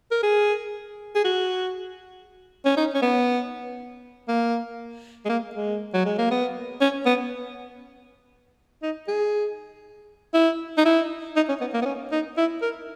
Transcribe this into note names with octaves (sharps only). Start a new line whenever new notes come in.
A#4
G#4
G#4
F#4
C#4
D#4
C#4
B3
A#3
G#3
A#3
G#3
F#3
G#3
A#3
B3
C#4
B3
D#4
G#4
E4
D#4
E4
D#4
C#4
B3
A#3
B3
C#4
D#4
E4
A#4